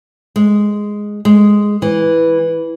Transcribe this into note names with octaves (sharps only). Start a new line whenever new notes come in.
G#3
G#3
E3